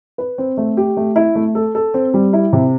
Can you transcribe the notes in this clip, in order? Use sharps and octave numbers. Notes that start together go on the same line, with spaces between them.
B4
C4
A3
G4
A3
E4
A3
A4
A4
C4
G3
E4
C3